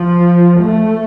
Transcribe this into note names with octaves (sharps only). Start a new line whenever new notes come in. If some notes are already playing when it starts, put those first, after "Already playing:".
Already playing: F3
A3